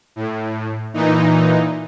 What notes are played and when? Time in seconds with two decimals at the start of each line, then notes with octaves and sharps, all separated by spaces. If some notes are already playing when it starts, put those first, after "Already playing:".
0.16 A2
0.94 A#2 E3 D#4